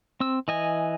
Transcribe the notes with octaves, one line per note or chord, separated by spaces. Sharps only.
C4 E6
E3 D#5 G#5